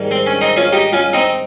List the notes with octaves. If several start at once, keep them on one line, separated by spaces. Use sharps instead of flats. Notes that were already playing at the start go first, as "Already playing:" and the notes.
Already playing: G#2 D#3 G3
C4
C#4
C4 D#4
C#4 F4
D#4 G4
C#4 F4
C4 D#4